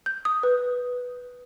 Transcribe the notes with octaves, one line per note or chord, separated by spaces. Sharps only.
G6
D#6
B4